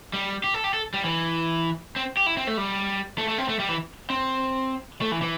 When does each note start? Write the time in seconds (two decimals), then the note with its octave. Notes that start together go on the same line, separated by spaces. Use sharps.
0.14 G3
0.44 G4
0.54 A4
0.64 G4
0.74 A4
0.94 G3
1.05 E3
1.96 C4
2.17 G4
2.27 E4
2.37 C4
2.47 A3
2.57 G3
3.18 A3
3.28 A3
3.38 C4
3.49 A3
3.59 G3
3.69 E3
4.10 C4
5.02 A3
5.12 E3
5.22 E3